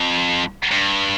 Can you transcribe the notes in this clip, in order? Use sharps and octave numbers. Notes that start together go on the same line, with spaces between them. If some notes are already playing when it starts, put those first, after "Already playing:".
Already playing: F2
G2